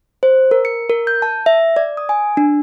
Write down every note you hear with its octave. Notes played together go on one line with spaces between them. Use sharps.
C5
A#4
C#7
A#4
G6
A5
E5
D5
D#6
G#5
D4